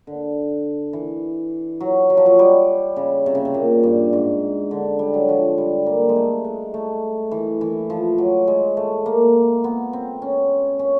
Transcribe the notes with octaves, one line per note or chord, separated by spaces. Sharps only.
D3
E3
F#3
F#3
F3
F#3
G3
C#3
C3
C#3
C3
A#2
G2
G#2
D3
G3
F#3
F3
G3
A#3
G#3
A3
G#3
A3
E3
E3
F3
F#3
G#3
A3
A#3
B3
C4
C#4
C#4